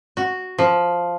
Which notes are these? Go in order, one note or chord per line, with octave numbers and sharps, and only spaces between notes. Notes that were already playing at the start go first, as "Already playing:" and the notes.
F#4
F3